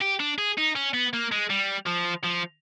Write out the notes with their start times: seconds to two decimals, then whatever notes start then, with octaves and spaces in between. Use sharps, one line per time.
0.02 G4
0.20 D4
0.38 G#4
0.58 D#4
0.75 C#4
0.94 B3
1.13 A#3
1.32 G#3
1.50 G3
1.86 F3
2.24 F3